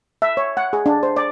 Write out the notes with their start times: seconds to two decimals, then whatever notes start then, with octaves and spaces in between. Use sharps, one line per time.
0.22 E5
0.37 C#5
0.57 F#5
0.73 G#4
0.86 D4
1.03 C5
1.16 D5